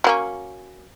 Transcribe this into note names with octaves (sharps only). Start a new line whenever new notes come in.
F#3 A#3 C#4